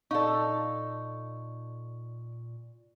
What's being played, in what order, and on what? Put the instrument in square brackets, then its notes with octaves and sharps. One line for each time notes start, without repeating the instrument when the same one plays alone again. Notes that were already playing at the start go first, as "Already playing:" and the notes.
[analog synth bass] A#2 [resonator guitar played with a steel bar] D#4 A4 [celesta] D5 F5 C#6